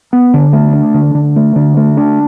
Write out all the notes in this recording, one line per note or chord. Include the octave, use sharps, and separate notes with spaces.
B3
D3
A3
D4
D3
D3
A3
D3
A3
D4